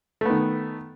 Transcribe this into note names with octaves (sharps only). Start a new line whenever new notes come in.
D#3 A3 B3